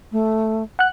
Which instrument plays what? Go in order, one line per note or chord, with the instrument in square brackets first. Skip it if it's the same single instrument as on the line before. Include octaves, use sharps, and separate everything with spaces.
[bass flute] A3
[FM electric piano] F#5 F#6